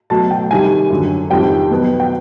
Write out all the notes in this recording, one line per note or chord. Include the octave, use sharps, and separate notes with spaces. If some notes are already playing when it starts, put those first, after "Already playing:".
B2 F#3 A3 A5
G5
C3 D#3 G3 G#5
F#2 D3 F#3
F2 C3 D#3 G3 C4 G5
B2 F#3 B3
G5